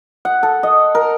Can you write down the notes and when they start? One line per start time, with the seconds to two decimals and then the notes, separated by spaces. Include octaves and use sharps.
0.25 F#5
0.43 A4
0.63 D#5
0.95 A#4